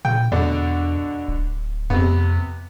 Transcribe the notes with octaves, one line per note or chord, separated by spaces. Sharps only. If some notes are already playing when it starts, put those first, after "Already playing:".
A#2 G5
E2 B2 D3 D4
D1
F2 C3 B3